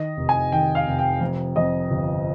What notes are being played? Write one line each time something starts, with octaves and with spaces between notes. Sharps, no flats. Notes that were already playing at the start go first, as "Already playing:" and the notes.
Already playing: D#3 D#5
F1
G#5
D#3 G5
F5
F1
G5
F2
F2 D#5
G1